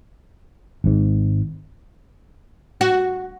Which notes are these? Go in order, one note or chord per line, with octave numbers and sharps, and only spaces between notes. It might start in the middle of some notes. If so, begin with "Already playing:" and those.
G#1 G#2
F#4